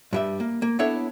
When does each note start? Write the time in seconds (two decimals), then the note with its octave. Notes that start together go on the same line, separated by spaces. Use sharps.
0.13 G2 G3 E5
0.40 A#3
0.62 A#3
0.79 B3 D4 E4 A4 C#5 E5